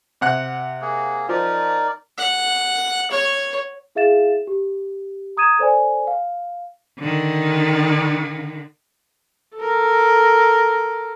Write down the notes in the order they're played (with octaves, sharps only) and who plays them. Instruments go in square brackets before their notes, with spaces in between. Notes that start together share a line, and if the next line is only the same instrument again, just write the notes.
[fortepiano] C3 F#5 F#6
[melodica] A#3 G#4
[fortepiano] F3 [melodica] D#4 A#4 D5
[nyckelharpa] F#5
C#5
[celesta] E4 G#4 E5 F5 A6 E7
G4
A#5 D#6 G#6 D#7 E7
A4 C5 D5 G#5
F5
[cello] D3 D#3
[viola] A4 A#4